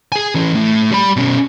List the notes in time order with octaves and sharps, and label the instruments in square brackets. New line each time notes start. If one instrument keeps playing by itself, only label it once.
[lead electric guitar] G#4 G#5
E3 C#4
A2
G3 B5
B2 C#4